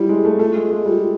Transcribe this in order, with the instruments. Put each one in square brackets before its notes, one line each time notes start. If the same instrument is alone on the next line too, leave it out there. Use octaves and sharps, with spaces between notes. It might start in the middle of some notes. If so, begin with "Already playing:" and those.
Already playing: [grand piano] F#3 G3 [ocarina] E4
[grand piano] G#3
A3
[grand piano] A3 [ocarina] F4
[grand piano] G#3
G#3
G3